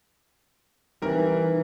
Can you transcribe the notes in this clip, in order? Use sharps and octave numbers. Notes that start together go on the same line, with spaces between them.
E3 G3 C4 D#4 A#4